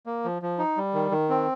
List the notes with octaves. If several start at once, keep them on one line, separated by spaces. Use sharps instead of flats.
A#3
F3
F3
D#4
G3
D#3
D#3
C4